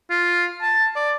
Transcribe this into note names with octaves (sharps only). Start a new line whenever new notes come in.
F4
A5
D5